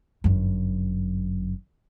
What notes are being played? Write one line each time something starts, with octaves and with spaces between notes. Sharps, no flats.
G1 F#2